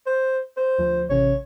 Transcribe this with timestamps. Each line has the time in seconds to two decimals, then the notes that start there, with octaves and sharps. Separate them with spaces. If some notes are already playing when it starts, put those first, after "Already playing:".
0.06 C5
0.57 C5
0.79 D2 F3
1.10 A1 C3 C#4 C#5